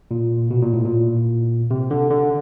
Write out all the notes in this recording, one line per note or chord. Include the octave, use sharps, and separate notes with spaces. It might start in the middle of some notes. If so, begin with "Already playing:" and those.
A#2
B2
A#2
A2
A#2
C3
D3
D3